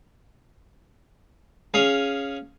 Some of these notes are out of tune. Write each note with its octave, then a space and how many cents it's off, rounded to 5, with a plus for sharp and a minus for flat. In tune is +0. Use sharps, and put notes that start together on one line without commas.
C#4 +0 G#4 +0 F5 +0